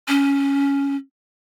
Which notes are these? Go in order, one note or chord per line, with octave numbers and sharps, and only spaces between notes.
C#4